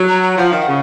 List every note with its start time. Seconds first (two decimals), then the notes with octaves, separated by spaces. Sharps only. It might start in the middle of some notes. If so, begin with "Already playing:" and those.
Already playing: F#3
0.08 A#5
0.22 A#5
0.37 F3 F#5
0.49 D#3 F5
0.61 F#5
0.67 C#3